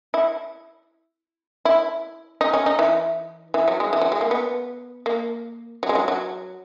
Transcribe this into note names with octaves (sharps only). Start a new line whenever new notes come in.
E4
E4
D#4
C#4
D#4
E3
E3
F#3
G#3
E3
F#3
G#3
A#3
B3
A#3
F#3
G#3
F#3
F#3